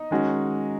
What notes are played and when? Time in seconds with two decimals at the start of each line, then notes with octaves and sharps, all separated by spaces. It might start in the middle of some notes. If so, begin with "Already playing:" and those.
Already playing: D#4
0.11 D#3 G#3 C#4 F#4